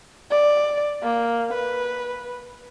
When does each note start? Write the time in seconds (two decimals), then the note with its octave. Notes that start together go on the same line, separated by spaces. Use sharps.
0.30 D5
1.03 A#3
1.54 B4